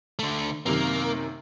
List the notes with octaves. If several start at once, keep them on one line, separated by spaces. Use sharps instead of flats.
D3 A3
F#2 C3 D#3 A#3